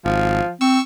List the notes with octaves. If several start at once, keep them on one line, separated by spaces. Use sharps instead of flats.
G#1 F3
C4 C#6 E6